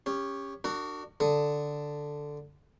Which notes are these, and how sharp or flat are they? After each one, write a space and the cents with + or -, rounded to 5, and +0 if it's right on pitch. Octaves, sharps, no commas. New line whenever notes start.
C#4 +0 G4 +25
D4 +30 F#4 +15 A#4 -30
D3 +0 A4 +5 D#6 +0